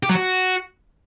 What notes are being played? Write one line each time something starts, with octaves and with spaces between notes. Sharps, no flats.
G4
F#3
F#4